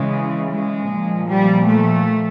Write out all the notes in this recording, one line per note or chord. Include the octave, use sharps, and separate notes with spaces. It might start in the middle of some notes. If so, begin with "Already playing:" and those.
Already playing: C#3 E3 G#3
G#3
A#2 F3
G3
A3